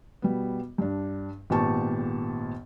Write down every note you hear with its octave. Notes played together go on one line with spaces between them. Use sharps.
B2 G3 B3
G2 D4
G#1 A#2 B3 G4 A5 C#6